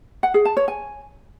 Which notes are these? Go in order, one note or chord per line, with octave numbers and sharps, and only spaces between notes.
F#5
G#4
A5
C#5
G#5